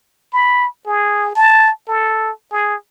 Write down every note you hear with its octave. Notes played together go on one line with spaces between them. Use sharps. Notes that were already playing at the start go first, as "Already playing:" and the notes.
B5
G#4
A5
A4
G#4